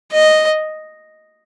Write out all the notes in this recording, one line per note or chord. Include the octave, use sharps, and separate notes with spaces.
D#5